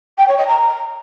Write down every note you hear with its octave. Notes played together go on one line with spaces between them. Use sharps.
G5
C#5
D#5
A#5